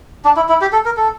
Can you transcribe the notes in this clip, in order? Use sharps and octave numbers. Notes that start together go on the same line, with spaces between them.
D4
E4
E4
G4
A4
A#4
A4